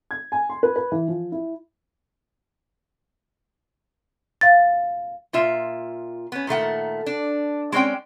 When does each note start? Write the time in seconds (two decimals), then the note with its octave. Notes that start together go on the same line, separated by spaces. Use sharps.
0.11 G#6
0.32 G#5
0.50 C6
0.63 B4
0.76 B4
0.92 E3
1.08 F3
1.32 E4
4.41 F5 A6
5.33 A#2 F4 E5
6.32 B3 C#4
6.47 A#2 D#3 A3 F#5
7.06 D4
7.72 G#3 C4 C#4 D5 G5